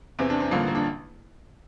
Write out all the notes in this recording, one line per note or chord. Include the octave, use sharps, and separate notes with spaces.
E2 C3 E3 C4
D4
C4
A1 G2 D3 F3 A#3
A#3
D4